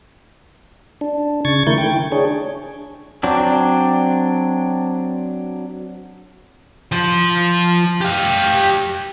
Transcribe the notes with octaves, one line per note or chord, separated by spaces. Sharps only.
D4
C#3 C#6 G#6 A6
D#3 A3 E4 A#4 C#6 G6
G5
D4 G#4 C#5
F#3 C4 D4
F3 C5
G4 F5